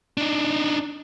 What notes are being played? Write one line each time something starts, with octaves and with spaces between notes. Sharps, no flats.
D4 D#4